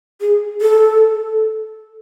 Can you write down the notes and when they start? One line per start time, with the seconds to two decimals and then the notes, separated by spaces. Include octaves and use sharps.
0.21 G#4
0.61 A4